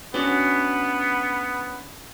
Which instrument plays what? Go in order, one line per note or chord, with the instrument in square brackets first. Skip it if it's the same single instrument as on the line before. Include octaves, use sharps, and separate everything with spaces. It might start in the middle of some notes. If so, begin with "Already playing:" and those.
[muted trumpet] B3 [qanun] C#4 D4 F#4